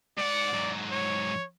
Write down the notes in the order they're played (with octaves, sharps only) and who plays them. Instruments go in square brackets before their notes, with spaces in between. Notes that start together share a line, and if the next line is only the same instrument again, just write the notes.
[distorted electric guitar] G#2 F#5 [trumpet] D5
[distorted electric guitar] G#2 F#3
[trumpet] C#5